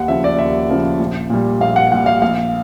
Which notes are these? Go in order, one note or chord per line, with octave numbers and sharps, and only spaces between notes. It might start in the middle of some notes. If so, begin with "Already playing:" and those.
Already playing: D#2 F#5
C#3 F3 E5
D5
D#2 E5
C#3 F3
A#1
A#2 G3
A#1 F5
F#5
A#2 G3 F#5
F5
A#1 F5